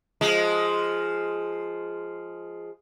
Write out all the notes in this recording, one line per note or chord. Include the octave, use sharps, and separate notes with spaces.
F3 G#3